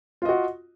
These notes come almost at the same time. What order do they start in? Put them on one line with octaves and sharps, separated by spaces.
F4 D#5 F#4